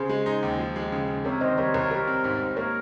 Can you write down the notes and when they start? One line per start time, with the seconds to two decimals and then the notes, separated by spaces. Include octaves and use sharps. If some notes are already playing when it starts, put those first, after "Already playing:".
Already playing: C#3 G#4 C5
0.09 G#3
0.26 D#4
0.43 D#2
0.59 F3
0.76 G#3
0.92 C#3
1.08 C#3
1.25 C3 A#4 C#5
1.41 D#3 C5 D#5
1.57 G3 A#4 C#5
1.74 C2 A#4 C#5
1.91 G3 G4 A#4
2.08 C4
2.24 G#2
2.40 G#2
2.56 A#3 A#4 C#5